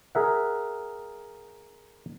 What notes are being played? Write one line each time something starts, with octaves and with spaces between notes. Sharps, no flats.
G#4 A#4 E5 F#5